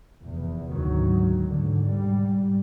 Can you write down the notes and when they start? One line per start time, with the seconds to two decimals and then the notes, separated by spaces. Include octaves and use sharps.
0.21 F1 E2
0.69 G#1 D2 D#3 F#3
1.43 G#2 B2 D3
1.85 G#2 G3